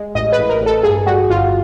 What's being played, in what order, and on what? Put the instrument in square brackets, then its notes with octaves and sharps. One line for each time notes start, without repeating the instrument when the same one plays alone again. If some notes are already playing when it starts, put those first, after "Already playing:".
Already playing: [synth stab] G#3
A1 D#5
B4
A1
A#4
A1
A4
G2 G#4
G3 F#4
G1 F4